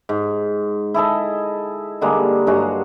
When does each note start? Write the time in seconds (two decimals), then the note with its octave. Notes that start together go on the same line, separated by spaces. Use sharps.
0.09 G#2
0.94 E4 G#4 A4 D#5
2.01 D3 G3 G#3 A#3
2.47 G2 F#3 G#3 F#4